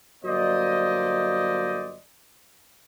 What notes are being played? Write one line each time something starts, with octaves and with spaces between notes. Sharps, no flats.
G1 F#3 A#3 C5 D5 D#5